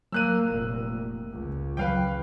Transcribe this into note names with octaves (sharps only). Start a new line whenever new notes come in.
F#3 A#3 E6 F#6 D#7
F1 A#2
C#2
F2 E3 F#3 B4 F5 G5